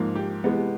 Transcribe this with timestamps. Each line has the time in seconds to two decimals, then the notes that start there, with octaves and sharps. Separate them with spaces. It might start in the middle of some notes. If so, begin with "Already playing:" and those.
Already playing: G#2 F3 A#3
0.15 G4
0.44 C3 E3 G#3 B3